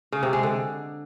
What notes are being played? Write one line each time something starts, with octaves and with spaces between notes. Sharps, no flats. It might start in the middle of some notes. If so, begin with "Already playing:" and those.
C#3
C3
G#3
D3